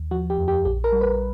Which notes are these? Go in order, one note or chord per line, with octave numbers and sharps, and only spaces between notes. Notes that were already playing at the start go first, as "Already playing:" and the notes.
Already playing: D#2
F3 F#4
G4
F2
G4
A#1 G4
A#4
G3
B4